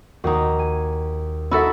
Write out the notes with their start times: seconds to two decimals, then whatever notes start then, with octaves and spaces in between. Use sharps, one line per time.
0.24 D#2 D#4 F#4
0.59 G#5
1.51 D#4 E4 F#4 A4 E5